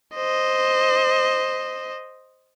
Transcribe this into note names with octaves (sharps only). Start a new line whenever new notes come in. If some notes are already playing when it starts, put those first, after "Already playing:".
C5 D#5